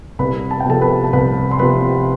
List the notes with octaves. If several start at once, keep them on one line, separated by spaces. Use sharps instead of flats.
C2 B4 B5
A5
G5
C3 F3 A4 A5
B4 B5
A5
C2 B4 B5
C6
C3 F3 B4 B5